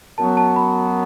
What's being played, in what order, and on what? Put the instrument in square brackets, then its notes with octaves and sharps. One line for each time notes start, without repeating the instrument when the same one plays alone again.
[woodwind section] F#2 F#3 B3 F#4 [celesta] A5
[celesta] A5
B5